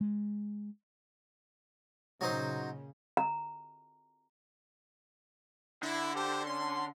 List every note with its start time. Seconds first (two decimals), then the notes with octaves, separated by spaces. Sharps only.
0.01 G#3
2.21 A#2 C#3 F#3 D#4 C5
3.17 A#5
5.83 D3 E4
6.16 G4 A4 C5
6.46 C#4 C6